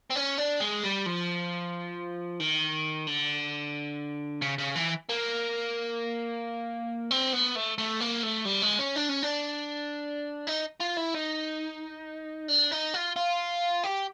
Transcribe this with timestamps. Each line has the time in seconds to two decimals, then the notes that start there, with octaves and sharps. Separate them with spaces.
0.10 C4
0.16 C#4
0.38 D4
0.60 G#3
0.83 G3
1.06 F3
2.40 D#3
3.07 D3
4.42 C#3
4.58 C#3
4.75 E3
5.09 A#3
7.11 C4
7.33 B3
7.56 A3
7.78 A3
8.00 A#3
8.23 A3
8.45 G3
8.62 G#3
8.79 C#4
8.96 D4
9.09 C#4
9.23 D4
10.48 D#4
10.81 F4
10.98 E4
11.15 D#4
12.49 D4
12.72 D#4
12.94 F4
13.16 F4
13.83 G4